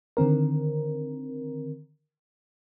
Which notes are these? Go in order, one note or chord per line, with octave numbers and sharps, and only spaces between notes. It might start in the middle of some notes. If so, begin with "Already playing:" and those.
D3 D#3 C4 A#4